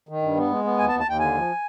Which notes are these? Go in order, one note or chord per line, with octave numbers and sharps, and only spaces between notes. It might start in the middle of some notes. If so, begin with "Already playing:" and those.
D#3
G2
B3
G#3
B3
D#2 G#5
A5
D#2
A5
D#2 G5
D3 G#5
F3